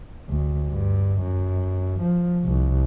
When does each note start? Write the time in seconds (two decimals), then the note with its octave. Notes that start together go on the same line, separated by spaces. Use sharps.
0.29 D2
0.70 G2
1.22 F#2
2.01 F3
2.45 C2